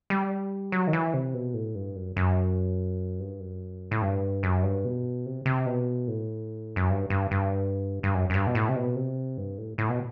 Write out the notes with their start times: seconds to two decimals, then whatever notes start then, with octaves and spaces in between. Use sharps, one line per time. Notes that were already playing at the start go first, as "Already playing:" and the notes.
0.10 G3
0.72 F#3
0.87 D#3
0.93 E3
1.14 C3
1.34 B2
1.54 A2
1.75 G2
1.96 F#2
2.17 F#2
3.20 G2
3.40 F#2
3.91 A2
4.02 G2
4.43 F#2
4.63 G2
4.85 B2
5.26 C3
5.46 C3
5.66 B2
6.08 A2
6.76 F#2
6.90 G2
7.10 G2
7.31 G2
8.03 G2
8.14 F#2
8.30 F#2
8.34 G2
8.47 B2
8.55 A2
8.69 C3
8.76 B2
8.96 C3
9.37 G2
9.58 A2
9.78 A2
9.89 B2